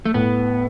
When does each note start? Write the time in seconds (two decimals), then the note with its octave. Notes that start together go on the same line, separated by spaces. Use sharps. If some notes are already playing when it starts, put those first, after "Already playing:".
0.06 A3
0.14 A2 B3